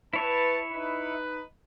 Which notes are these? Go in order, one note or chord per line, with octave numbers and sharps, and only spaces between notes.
E4 B4 C#5 E5 A5
D#4 B4